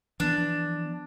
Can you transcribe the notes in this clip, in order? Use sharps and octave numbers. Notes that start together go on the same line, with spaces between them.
E3 F3 B3 D4